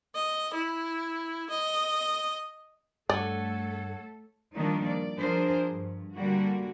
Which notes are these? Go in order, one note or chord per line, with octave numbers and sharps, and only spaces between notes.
D#5
E4
D#5
G2 A3 A4 C#5 D5 F#5
D#3 F3 G3 A#3 D4 D#4
D5
F3 D4 G#4 A#4 C5
G2
D3 G3 A#3 F#4